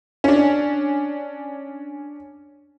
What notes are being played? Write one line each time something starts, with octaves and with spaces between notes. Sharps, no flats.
C#4 D4